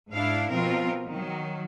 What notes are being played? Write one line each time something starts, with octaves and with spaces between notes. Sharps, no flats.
G#2 D4 E4 F5
B2 F3 C4 F4 A#4
D#3 F#3